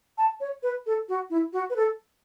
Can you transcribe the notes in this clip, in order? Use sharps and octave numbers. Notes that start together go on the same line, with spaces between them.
A5
C#5
B4
A4
F#4
E4
F#4
B4
A4